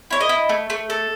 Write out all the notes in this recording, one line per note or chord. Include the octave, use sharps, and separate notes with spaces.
E4 C#5
D#5
E4
A3
A3
A4